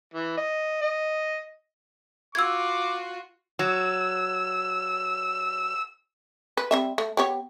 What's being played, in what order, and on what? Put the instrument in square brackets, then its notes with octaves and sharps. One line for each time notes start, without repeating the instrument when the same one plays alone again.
[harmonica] E3
D#5
D#5
[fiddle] F4 F#4 [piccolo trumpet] D6 [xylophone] E6 G#6
[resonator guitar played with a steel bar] F#3 [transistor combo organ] E6
[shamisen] B4
G3 C4 E5
A3
B3 G4 C#5